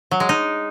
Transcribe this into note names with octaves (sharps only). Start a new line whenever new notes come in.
F#3
G#3
D#4